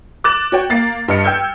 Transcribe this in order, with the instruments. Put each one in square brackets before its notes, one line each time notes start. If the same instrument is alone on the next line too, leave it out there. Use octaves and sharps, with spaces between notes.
[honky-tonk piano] D6 F#6 A6 E7
F#4 C#5 G5
A#3 A6 C7
G2 D#5 F6 C#7
G5 E6 F6 G6 G#6